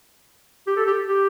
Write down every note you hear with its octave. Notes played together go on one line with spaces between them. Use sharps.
G4
A4
G4
G4